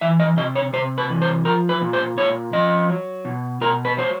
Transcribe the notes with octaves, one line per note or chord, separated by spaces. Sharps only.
E3 E5
D#5
C3 D#5
C#5
C3 C5
B4
E3
C5
F3 A#4
B4
A#2
C5
A#2 C#5
F3 D#5
F#3
B2
B2 A#4
B4
F#3 C5